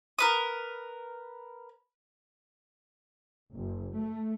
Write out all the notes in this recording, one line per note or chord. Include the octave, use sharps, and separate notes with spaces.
A#4 B4 D#6
F#1
A3